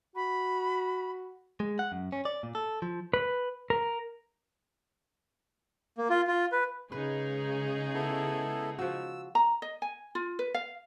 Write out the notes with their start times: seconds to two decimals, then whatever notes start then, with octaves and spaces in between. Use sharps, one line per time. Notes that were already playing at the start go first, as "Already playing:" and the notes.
0.16 F#4 B5
1.60 G#3
1.79 F#5
1.92 F#2
2.12 C#4
2.25 D5
2.43 A#2
2.55 A4
2.82 F3
3.14 B4
3.70 A#4
5.98 A#3
6.10 F4
6.27 F4
6.52 B4
6.92 C#3 G#3 D#4 G#4 B4
7.94 B3 E4 A4
8.79 F3 F#4 E6
9.35 A#5
9.62 D#5
9.82 G#5
10.15 F4
10.39 B4
10.54 F5